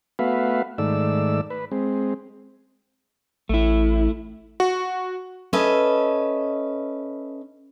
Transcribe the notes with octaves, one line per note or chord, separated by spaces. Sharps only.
A3 B3 F#4 B4 E5 F5
G#2 D#3 A3 D5 E6
B4
G#3 C4
A1 A3 E4
F#4
C#4 A4 B4 D#5 E5